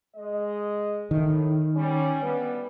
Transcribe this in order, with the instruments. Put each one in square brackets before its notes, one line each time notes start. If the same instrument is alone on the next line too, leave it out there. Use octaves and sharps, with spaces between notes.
[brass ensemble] G#3 D#5
[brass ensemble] A2 [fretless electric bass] D#3
[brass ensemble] G3 C#4
D2 G3 B3